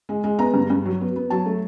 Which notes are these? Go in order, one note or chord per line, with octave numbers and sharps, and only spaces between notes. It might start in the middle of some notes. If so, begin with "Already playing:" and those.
G#3
G#3
B3 A#5
G2
G2
F#3
B3
B3
F#3 A5
A3